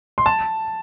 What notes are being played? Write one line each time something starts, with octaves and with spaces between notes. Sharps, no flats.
C6
A5